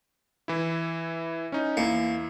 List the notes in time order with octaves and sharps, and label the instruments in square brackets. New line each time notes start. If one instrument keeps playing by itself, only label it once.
[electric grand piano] E3 E4
C#4 D#4
[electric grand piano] E2 E4 C#7 [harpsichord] A#3